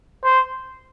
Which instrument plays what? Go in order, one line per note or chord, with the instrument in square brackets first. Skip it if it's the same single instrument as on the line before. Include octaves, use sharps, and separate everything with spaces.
[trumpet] C5